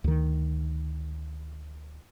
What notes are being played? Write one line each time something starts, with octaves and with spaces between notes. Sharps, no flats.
D2 D#3